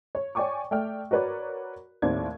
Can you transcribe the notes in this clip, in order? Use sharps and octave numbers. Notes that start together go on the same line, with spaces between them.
C#5
C#5 D5 G5 G#5 C#6 D6
A3 D5 G5 F6
F#4 A#4 B4 C#5 D5
D#2 A2 C4 D5 G#6